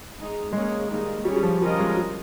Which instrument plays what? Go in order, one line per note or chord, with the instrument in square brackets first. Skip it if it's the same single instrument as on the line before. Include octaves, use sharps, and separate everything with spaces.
[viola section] G#3 D#4 G#4
[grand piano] G#3 [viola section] A#3 C#4 G#4 C#5
[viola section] D#3 G3 A#3 D#4 G#4
[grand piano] G3 [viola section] C#4 G#4 C#5
[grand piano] G3
F3
[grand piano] G3 [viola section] C#4 F4 A#4 D#5
[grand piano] G#3
G3